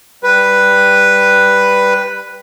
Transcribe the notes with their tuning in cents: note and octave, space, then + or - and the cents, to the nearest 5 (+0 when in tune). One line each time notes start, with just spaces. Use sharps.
G3 +0 B4 +0